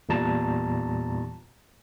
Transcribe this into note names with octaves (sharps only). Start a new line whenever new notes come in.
E2 A#2 G3 A5 A#5